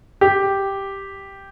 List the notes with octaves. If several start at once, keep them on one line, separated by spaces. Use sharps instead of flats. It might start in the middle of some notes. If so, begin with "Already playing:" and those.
G4